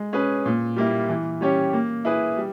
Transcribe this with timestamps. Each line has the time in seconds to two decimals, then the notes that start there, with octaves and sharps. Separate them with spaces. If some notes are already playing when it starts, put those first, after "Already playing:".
Already playing: G#3
0.13 C#4 G#4 B4
0.46 A#2
0.76 G3 A#3 E4
1.09 E3
1.41 G3 C#4 G4 C#5
1.73 A#3
2.05 E4 G#4 B4
2.37 G3